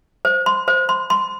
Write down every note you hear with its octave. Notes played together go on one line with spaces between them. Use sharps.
C5
C6
C5
C6
C6